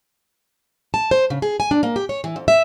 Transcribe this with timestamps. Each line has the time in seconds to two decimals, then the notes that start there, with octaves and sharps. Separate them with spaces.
0.94 A5
1.11 C5
1.30 C#3
1.42 G#4
1.60 G#5
1.71 D4
1.83 A#3
1.96 G4
2.09 C#5
2.24 E3
2.36 F2
2.48 E5